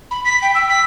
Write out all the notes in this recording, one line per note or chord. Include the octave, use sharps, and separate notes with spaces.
B5
B6
G5
E6
B6